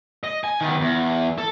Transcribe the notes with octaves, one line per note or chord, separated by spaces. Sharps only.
D#5
G#5
D#3 B3
E2
A4